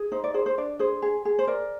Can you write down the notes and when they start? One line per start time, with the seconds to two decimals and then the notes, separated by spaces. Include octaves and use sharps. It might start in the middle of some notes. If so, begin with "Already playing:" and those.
Already playing: G#4
0.12 D#4 C5
0.24 D5
0.34 G#4 C5
0.46 C5
0.58 D4 D5
0.79 G#4 C5
1.02 G#4
1.25 G#4
1.39 C5
1.47 A#4 D5